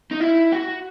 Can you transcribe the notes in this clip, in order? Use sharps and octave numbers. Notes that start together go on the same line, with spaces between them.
D#4
E4
F#4